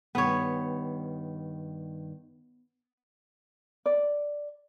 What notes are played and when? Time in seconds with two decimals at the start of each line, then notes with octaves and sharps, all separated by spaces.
0.15 G2 D#3 B3 C#5
3.86 D5